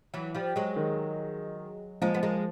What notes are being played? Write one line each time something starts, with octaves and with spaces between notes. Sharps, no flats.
E3 F#3
F3 G3
F#3 G#3
D#3
F3 G#3 A#3
B3
G#3 A#3